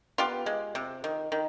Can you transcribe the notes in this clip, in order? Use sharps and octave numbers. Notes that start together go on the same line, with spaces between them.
B3 F4 G4
G#3
C3
D#3
D#3